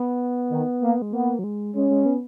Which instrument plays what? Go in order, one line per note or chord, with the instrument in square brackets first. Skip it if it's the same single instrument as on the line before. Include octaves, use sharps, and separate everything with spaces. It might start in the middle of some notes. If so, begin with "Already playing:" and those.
Already playing: [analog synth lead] B3
[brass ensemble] D#3
A#3
[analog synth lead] G#3
[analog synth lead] A#3 [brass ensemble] B3
[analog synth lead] F#3
G#3
[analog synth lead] G#3 [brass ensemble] C#4
[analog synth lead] G#3
B3